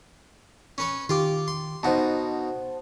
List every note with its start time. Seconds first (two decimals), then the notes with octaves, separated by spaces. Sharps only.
0.78 C#4 B4 C#5
1.09 D#3 F4 G4 F5 D6
1.48 C6
1.83 B2 D#4 C5 F#5 A5